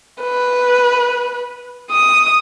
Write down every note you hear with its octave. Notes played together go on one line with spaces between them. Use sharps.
B4
D#6